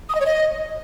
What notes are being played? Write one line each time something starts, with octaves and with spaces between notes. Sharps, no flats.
D#6
D#5
C#5
D#5